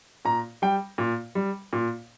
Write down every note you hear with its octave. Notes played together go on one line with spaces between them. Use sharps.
A#2 A#5
G3 G5
A#2
G3
A#2